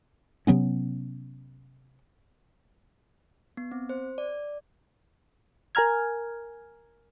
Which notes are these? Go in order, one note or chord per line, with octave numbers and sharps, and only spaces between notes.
C3 F#3 B3 C#4
B3
C4
C5
D5
A#4 G#5 A#5 F6 G#6